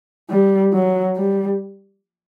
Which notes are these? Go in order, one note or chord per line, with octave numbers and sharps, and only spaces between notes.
G3
F#3
G3